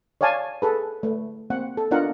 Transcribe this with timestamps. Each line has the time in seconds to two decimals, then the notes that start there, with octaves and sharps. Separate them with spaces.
0.21 C#5 D5 F5 G#5 A5
0.62 G#4 A4 B4
1.03 A3 B4
1.50 A#3 C4 F#5
1.77 A4
1.91 B3 D4 F4 A#4 D#5 F#5